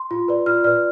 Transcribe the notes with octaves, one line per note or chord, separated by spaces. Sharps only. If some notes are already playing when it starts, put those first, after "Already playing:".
Already playing: C6
F4
B4 D5
F4 F6
B4 D5 F6